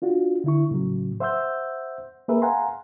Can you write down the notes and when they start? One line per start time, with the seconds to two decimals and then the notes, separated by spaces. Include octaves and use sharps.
0.02 D4 F4 F#4
0.44 D3 E4 C#6
0.71 A2 C#3 F#3
1.20 C5 E5 F#5 C6 E6 G6
2.28 A#3 G#4 A#4 B4 E5
2.42 F5 F#5 G#5 A#5 C6